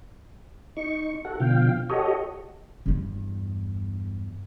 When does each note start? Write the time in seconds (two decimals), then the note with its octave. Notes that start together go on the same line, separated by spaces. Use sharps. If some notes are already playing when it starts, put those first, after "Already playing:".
0.77 D#4 C#6
1.25 F#4 A4 F#5
1.40 B2 D3 F3 F5 G5
1.90 F#4 G4 A4 C#5 D#5
2.86 E2 G2